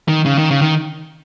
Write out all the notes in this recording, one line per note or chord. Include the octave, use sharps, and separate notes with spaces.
D#3
C#3
D#3
C#3
D#3